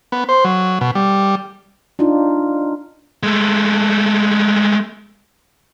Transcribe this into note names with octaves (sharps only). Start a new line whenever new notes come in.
B3
C5
F#3
B2
G3
D4 D#4 F4
G#3 A3